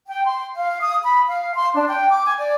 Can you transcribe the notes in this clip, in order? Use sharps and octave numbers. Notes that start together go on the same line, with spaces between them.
G5
C6
F5
D#6
B5
F5
C6
D4
G5
D6
G#5
D5